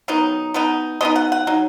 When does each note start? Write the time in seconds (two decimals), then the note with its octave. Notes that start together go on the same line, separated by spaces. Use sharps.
0.08 D#3 F#3 B3 D#4
0.54 B2 B3 D#4
1.01 B2 B3 D#4 D#5
1.16 F#5
1.32 F#5
1.47 F#3 D#4